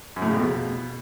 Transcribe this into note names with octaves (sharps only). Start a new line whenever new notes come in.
F#2
A2
C#3
F2
B2